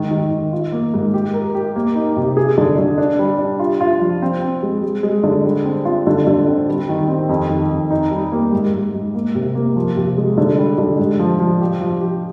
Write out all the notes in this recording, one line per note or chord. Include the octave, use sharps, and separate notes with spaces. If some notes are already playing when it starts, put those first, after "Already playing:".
Already playing: G#2 D#3
D#3
D#3
F4
A#3
G#2
G4
A#4
G4
A#3
D#4
C3
G#4
D3
D3
D4
G3
D4
F4
F4
F3
C4
C4
G#3
G#3
G#3
D3
G3
C4
F4
D3
D3
C4
G3
D#3
C4
F2
D#3
F2
D#4
G3
A#3
G#2
G#2
G#2
A#3
C3
A#3
F3
C3
G#3
D3
G3
D3
G#2
F3
F3
G4
F3
G4